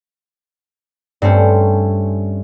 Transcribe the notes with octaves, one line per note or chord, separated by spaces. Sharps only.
G2 A3 C4 C#4